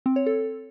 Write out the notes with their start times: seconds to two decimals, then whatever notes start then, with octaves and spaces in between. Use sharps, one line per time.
0.06 C4
0.16 C#5
0.26 A4